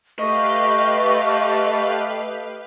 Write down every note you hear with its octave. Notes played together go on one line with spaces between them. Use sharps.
A3 G4 B4 D#5 F5 C#6